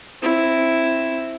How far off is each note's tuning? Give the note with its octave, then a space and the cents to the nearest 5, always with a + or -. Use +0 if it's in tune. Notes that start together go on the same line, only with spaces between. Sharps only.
C4 +15 E4 +0